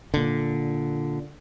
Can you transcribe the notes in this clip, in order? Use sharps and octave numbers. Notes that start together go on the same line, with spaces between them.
A#2 D3